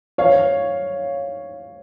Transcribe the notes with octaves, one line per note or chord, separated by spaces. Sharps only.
C#5 F5